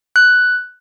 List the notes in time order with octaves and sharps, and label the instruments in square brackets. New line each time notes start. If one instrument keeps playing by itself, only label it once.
[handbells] F#6